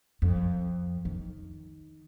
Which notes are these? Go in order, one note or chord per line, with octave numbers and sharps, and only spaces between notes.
F2
D#3